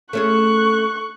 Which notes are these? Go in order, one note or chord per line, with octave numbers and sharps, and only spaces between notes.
A3 C#4 G#4 C#6 F#6